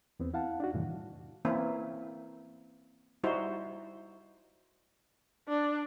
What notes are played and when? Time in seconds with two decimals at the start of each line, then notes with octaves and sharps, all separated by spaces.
0.20 E2 B3 C4
0.34 E4 F5 F#5 A5
0.60 D4 D#4 F#4
0.73 F2 A2 C3 D#3 E3 G3
1.45 E3 A#3 C4 C#4 E4
3.24 G3 D#4 E4 F#4 C5
5.48 D4